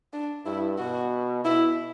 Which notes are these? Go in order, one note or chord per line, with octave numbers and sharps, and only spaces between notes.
D4
G2 E4
B2 F#4
B2 E4